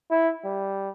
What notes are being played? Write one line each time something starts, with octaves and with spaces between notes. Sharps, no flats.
E4
G3